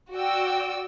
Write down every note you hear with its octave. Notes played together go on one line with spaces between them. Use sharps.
F#4 D5 G5 E6